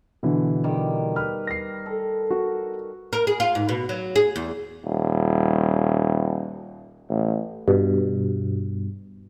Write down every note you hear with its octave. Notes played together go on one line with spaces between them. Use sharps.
B2 D3 E3
D#3 G3
B4 F6
A#6 C7
A4
F#4
A#4
G#4
F4
G#2
B2
F#3
G#4
E2
D#1
A1
G2 B2